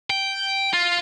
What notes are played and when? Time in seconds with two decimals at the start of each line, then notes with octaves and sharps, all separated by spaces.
0.10 G5
0.74 F4